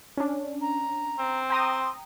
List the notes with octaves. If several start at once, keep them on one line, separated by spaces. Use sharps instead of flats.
C#4 D4
A#5
C4
G5 A#5 C6 D#6